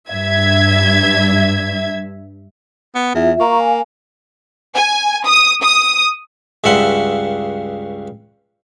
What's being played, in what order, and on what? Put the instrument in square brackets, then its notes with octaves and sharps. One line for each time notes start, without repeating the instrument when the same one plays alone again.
[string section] G2 E5 G#6
[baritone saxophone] B3
[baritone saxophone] E2 [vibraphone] F4 E5
[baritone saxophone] A#3 [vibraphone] A#5 C#6
[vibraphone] F5 G#5
[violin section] G#5
D#6
D#6
[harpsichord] C#2 G2 C#3 E5 F#5 C6